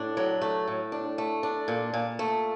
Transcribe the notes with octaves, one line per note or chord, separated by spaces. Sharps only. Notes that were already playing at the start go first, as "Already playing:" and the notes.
Already playing: A2 D4
F#3
A3
A2
D4
A3
D4
A#2
A#2
A3